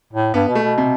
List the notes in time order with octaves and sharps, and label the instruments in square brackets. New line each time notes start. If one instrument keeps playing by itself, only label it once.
[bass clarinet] A2
[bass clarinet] G2 [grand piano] B3
[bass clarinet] B2
[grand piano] A3
[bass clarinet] B2
[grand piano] C3